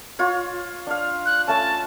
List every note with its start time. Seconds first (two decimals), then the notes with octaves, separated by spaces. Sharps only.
0.19 F4 C#5
0.87 D4 F5
1.25 F#6
1.47 A3 C#4 A5